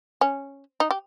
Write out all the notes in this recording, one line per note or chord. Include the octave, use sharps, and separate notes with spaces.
C#4
D#4
G4